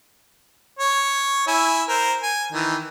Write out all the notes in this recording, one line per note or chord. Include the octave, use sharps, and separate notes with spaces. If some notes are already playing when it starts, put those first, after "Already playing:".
C#5
E4 G#5 E6
A#4 C5
G#5
D#3 E3